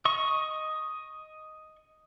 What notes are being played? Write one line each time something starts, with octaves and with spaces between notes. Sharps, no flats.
D#5 C#6